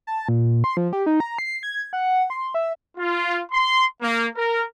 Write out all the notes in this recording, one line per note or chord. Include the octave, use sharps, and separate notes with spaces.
A5
A#2
C6
F3
G4
D#4
A#5
C7
G#6
F#5
C6
E5
F4
C6
A#3
A#4